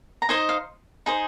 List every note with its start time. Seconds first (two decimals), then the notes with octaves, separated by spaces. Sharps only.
0.22 A#5
0.29 D#4 C5 D#5 G#5
0.49 F5
1.06 D#4 G#4 C5